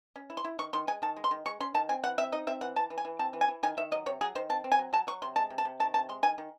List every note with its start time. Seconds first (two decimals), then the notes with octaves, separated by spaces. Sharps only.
0.16 C#4
0.30 E4
0.37 C6
0.44 E4
0.59 D#3 C#6
0.73 D#3 C6
0.87 G#3 G#5
1.02 D#3 A5
1.16 G#3
1.24 C6
1.31 D#3
1.46 G#3 C#6
1.60 C#4 C6
1.74 D#3 A5
1.89 C4 G#5
2.03 E3 F#5
2.18 C4 E5
2.32 D#4 D#5
2.47 C4 E5
2.61 E3 F#5
2.76 E3 A5
2.90 E3
2.98 G#5
3.05 E3
3.19 C4 A5
3.33 E3
3.41 G#5
3.48 E3
3.63 D#3 G#5
3.77 D#3 E5
3.91 F#3 D#5
4.06 C3 C#5
4.21 F#3 G#4
4.35 D#3 C5
4.49 C4 A5
4.64 C4
4.72 G#5
4.79 F#3
4.93 F#3 A5
5.07 F#3 C#6
5.22 C3 C6
5.36 G#3 A5
5.50 C3
5.58 A5
5.65 C3
5.80 D#3 A5
5.94 C3 A5
6.09 G#3 C6
6.23 D#3 G#5
6.38 D#3